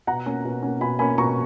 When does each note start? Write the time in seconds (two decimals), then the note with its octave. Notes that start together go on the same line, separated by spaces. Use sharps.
0.07 B2 F#5 A#5
0.26 A#3 C#4
0.45 B2
0.63 A#3 C#4
0.81 B2 G#5 B5
0.99 A#3 C#4 G#5 B5
1.18 B2 A#5 C#6